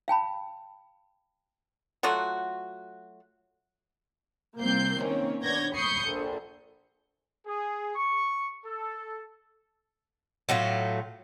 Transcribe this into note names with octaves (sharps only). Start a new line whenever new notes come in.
F5 G5 A5 B5
F#3 A3 F4 F#4
C2 A#3 C4 G6 C7
D#3 A#3 C4 C#4 C#5
B3 D4 C#5 G6 G#6 A#6
B5 C#6 D#6 G6 C7 C#7
A#1 A4
G#4
C#6
A4
A2 F#3 A3 F4